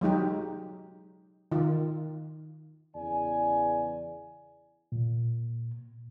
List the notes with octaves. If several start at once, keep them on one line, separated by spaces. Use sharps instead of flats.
F#3 G#3 D#4 G4
D#3 F4
E2 C#3 E3 D5 G#5
A#2